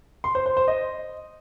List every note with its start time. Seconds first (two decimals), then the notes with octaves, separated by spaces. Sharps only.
0.24 C6
0.35 C5
0.46 C5
0.57 C5
0.68 D#5